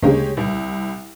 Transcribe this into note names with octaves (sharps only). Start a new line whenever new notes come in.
D2 C#3 G#3 A#3 G4 C#5
C2